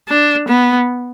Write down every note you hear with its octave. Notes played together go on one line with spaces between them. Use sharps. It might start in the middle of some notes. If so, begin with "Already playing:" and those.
D4
B3